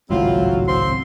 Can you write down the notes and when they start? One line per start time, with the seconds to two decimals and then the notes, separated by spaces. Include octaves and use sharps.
0.10 G#1 C#2 A2 F#3 C4 E4 F4
0.68 C4 C6